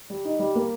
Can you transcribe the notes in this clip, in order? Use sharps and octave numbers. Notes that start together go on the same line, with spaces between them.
G3
D#4
G3
A#3